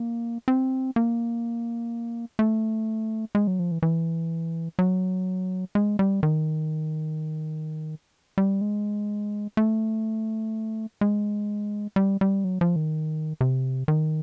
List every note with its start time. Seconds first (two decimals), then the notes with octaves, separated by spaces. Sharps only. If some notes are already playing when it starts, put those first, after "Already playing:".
Already playing: A#3
0.48 C4
0.96 A#3
2.39 A3
3.35 G#3
3.47 F#3
3.59 F3
3.71 E3
3.82 E3
4.79 F#3
5.75 G#3
5.99 G3
6.23 D#3
8.38 G3
8.61 G#3
9.57 A3
11.01 G#3
11.96 G3
12.21 G3
12.44 F#3
12.61 F3
12.76 D#3
13.41 C3
13.88 D#3